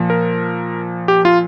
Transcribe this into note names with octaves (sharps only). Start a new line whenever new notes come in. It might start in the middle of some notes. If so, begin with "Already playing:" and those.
Already playing: A#2 F3
A#4
G4
F4